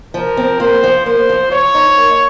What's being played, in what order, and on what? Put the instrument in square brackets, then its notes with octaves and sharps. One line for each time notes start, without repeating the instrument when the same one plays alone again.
[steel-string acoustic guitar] F3 [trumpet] A#4
[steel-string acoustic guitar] C4
[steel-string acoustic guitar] A#3 [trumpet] C5
[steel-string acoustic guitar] F3
[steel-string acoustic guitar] A#3 [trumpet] C5
[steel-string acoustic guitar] F3
[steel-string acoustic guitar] F3 [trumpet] C#5
[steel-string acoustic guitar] D#4
A#3